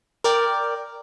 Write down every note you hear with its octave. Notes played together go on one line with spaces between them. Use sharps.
A#4 D5 G5